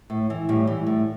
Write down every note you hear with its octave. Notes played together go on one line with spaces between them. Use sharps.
A2
E3
A2 G3
E3
A2